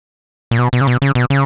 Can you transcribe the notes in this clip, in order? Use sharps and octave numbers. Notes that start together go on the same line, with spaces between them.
A#2
B2
B2
C#3
B2
C#3
B2
C#3